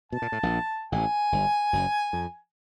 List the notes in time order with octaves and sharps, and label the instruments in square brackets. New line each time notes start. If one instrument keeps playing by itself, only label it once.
[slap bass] B2 [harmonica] A5
[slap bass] A#2
A2
A#1 A#2
[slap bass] A1 A2 [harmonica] G#5
[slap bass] G1 G2
F#1 F#2
F2